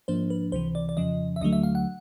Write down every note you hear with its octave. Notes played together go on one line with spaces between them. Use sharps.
G#2 F3 A#3 D4 C5
B4
C#2 C3 E3 C5
D5
D5
F2 C#3 F3 D#5
E5
D2 D3 F#3 A3 D#5
E5
F5
F#5